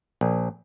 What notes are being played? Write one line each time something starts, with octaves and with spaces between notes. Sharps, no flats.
A#1